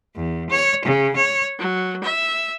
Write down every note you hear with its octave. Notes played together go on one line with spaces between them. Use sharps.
E2
C#5
C#3
C#5
F#3
E5